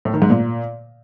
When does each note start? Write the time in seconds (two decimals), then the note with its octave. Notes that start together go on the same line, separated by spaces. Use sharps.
0.05 A2
0.14 D#3
0.22 G#2
0.30 A#2